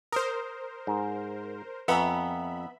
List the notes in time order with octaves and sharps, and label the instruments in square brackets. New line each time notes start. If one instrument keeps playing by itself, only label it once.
[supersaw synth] A#4 C5 [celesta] D#6
[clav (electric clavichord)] G#2
[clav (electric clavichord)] F2 [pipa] B3 [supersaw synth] E5 B5 [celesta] G#5 A#5 C#7